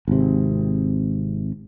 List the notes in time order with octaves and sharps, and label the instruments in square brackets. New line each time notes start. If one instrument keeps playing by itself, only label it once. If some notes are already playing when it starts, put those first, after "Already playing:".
[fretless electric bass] G#1 C3